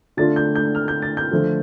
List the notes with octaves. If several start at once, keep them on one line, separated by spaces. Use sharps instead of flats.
D3 A3 D4 F4 A6
G6
G6
F6
G6
A6
G6
D3 F3 A3